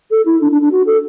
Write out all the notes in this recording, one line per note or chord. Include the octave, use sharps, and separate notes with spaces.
A4
E4
D4
D4
D4
F#4
A4